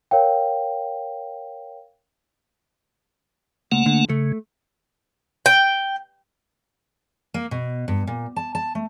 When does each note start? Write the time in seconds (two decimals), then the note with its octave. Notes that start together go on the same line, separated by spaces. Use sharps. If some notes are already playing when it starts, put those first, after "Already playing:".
0.11 A#4 C#5 F5 G5
3.72 C#2 A3 A#3 F#5
3.86 D3
4.10 C#3 A3
5.46 G5
7.34 A#3
7.51 B2
7.88 G2
8.07 A#2
8.36 A5
8.55 A5
8.75 A3